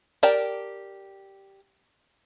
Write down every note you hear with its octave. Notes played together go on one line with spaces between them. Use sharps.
G4 A#4 D5 G5 A5